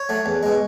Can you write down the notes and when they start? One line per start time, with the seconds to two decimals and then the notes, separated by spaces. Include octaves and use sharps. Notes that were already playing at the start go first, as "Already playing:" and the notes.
Already playing: C#5
0.09 F#3 A3
0.26 E2
0.43 B2 G#3